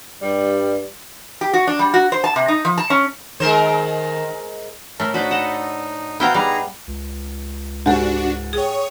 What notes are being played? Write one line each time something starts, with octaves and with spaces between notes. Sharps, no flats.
G2 G3
G4
F#4
D4
G3
F#4
C5
A5
C3
D#4
F3
A5
C#4
D#3 G#3 A#4 C5
A2 A3 A#4
D4 D#4 F4 F#4 C5 B5
A4 D#5 F#5
B3 E4 F#4 F5 G5 A#5 G6
G3 D#4 G#4 F5 A#5
C#2
G#2 D4 F#4 G4 A4 F#5
G#4 C#5 G5 D#6